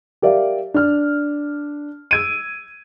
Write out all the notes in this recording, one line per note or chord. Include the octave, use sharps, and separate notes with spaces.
G4 A#4 D5 E5 F5
D4 F6
E6 G#6 D7 D#7